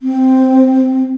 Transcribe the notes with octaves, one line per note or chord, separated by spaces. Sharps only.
C4